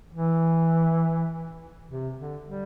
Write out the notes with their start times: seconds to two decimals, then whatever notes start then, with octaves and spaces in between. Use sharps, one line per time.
0.12 E3
1.89 C3
2.18 D3
2.47 G3